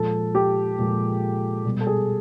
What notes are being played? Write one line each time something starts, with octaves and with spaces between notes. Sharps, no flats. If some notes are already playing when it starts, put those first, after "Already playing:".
Already playing: A#2 F3 G#3 A4
G4
A#2 F3 G#3
B2 G3
A4
G#4